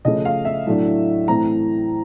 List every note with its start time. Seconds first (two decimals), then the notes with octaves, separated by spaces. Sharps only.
0.05 C#3 F3 A3 C#4 D#5
0.25 F5
0.45 E5
0.67 A2 F#3 A3 D4
1.28 A2 E3 A3 C4 A#5